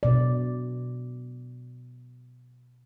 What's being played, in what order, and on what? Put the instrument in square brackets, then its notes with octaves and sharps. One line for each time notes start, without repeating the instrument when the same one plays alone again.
[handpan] B2 D5